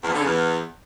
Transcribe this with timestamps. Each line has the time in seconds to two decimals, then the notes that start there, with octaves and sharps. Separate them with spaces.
0.04 E2
0.09 F2
0.14 D3
0.19 C#3
0.24 E2